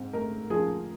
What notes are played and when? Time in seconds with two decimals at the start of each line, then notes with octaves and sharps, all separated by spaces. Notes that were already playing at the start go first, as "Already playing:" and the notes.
Already playing: G#2 C4
0.13 A3 A#4
0.50 F3 G#4